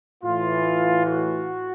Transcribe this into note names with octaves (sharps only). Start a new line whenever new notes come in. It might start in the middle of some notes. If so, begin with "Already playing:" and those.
A2 E3 F4
F#4